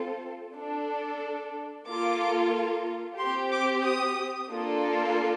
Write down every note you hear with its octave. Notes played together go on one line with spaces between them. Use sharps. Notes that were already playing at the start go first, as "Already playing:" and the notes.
Already playing: C4 F4 A4
D4 A4
A#3 F4 A4 D6
G4 C6
C4
D6
D#6
A#3 D4 F4 A4